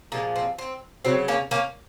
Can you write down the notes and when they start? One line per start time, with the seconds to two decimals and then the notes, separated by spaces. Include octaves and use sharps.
0.12 A#2 F3 G#3 A#3
0.36 C4
0.58 C4
1.05 C#3 F#3 C4
1.28 A#3 C#4
1.51 A#3 C#4